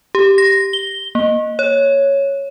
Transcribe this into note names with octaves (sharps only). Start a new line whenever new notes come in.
G4
A#6
G7
A#3
C#5